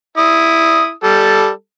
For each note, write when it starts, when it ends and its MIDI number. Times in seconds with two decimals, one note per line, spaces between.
0.18 0.91 64
0.18 0.91 87
1.04 1.49 55
1.04 1.49 69